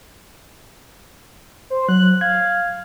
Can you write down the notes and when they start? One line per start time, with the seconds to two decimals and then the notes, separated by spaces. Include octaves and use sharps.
1.70 C5
1.89 F#3 F#6
2.21 F5 G#6